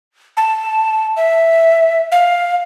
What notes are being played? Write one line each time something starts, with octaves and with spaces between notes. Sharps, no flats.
A5
E5
F5